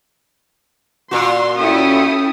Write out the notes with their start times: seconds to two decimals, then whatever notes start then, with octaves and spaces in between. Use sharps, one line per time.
1.11 A#2 F#4 C6
1.58 C#4 E4 A4 G5 D#6